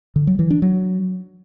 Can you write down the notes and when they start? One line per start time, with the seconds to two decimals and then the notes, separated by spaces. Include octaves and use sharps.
0.16 D3
0.27 F#3
0.39 E3
0.50 D4
0.62 F#3